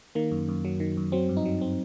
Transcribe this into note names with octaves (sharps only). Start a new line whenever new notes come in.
D#3 A#3
F#2
F#2
F#3
D#3
F#2
F#3 C4
G2
D#4
F#3
C4